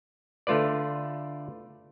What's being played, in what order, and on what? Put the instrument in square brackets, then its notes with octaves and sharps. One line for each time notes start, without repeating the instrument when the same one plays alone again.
[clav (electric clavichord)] D3 A3 F4 B4 D5